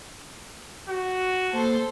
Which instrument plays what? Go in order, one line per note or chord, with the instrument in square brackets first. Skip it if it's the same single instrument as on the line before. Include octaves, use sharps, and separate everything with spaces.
[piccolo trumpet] F#4
[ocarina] A#3 [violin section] A4 C5